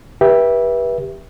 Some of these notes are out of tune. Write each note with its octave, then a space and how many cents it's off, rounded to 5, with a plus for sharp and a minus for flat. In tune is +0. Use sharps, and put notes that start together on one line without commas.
G4 +5 B4 -30 E5 +0